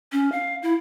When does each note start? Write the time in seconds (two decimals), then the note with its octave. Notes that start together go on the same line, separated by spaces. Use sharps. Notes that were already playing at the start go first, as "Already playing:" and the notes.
0.12 C#4
0.32 F5
0.63 E4